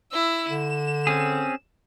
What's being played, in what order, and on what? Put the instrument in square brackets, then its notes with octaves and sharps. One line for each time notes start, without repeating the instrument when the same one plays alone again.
[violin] E4 E6
[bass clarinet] D3 [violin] E7
[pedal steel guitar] C4 C#4 G#4